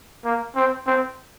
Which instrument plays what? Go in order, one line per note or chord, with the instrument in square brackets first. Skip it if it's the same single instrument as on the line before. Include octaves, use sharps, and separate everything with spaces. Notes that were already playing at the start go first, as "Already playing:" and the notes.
[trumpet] A#3
C4
C4